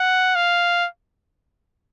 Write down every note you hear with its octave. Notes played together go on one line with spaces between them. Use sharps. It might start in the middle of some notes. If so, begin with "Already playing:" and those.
Already playing: F#5
F5